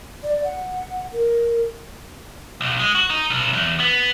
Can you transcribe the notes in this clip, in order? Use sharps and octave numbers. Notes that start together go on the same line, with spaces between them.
D5
F#5
A#4
B1
G#3
F#4
D#4
B1
E2
B3